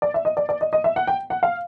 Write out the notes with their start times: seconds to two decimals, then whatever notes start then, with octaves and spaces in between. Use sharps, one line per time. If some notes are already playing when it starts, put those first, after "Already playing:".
0.02 D5
0.14 E5
0.25 D#5
0.37 D5
0.49 D5
0.61 D#5
0.73 D#5
0.84 E5
0.96 F#5
1.07 G5
1.30 F#5
1.43 F5